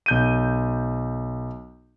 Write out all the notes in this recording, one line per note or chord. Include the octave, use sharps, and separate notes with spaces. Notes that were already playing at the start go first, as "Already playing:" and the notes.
B1 G6 D#7